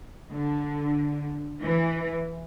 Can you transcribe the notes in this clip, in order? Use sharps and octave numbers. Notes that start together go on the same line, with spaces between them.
D3
E3